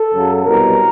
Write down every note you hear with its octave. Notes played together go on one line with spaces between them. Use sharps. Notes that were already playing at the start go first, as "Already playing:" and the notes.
Already playing: A4
F#2 C#3 F#3
C2 B2 F#3 A#4